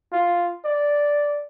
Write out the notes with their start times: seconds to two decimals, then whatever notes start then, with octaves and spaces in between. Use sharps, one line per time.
0.12 F4
0.65 D5